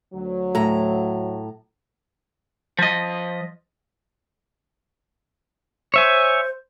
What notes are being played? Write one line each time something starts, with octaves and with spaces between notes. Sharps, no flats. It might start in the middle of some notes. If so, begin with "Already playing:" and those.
D2 F#3
A2 A#5
F3 D#5
C5 C#5 E5 G#5